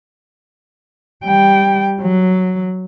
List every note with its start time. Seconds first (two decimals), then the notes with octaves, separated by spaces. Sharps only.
1.25 G3 G5
2.01 F#3